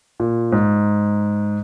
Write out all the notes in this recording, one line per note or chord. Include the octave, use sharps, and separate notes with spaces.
A#2
G#2